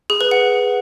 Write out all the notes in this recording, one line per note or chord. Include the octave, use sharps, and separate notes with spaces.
G#4
B4
F#5